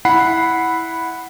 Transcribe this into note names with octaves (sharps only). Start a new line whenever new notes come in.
E4 F#5 B5 C7